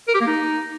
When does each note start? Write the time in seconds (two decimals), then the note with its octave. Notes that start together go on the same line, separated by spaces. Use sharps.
0.08 A#4
0.14 G4
0.21 A#3
0.27 D#4